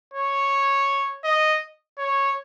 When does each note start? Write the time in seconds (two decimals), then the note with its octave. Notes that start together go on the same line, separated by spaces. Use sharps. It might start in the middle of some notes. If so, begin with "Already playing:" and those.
0.14 C#5
1.24 D#5
1.98 C#5